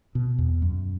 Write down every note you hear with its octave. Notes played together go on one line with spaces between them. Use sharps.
B2
E2
F#2